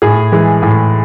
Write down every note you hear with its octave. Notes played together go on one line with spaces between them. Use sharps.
A2 G#4
E3 G#3
A2